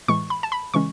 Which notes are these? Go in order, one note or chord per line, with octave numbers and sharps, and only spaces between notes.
A2 E3 G#3 C#6
B5
A5
B5
C#3 E3 G#3 C#4 C#6